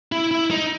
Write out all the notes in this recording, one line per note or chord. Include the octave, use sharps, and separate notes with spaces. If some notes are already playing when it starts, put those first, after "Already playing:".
E4
E4
D#4